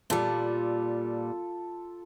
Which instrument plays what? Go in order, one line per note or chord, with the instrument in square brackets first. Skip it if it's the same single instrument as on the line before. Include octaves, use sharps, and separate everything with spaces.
[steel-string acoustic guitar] A#2 G3 [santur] F4 A4